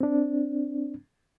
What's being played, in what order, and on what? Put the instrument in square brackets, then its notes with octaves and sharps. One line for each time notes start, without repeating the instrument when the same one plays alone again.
[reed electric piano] C4 D4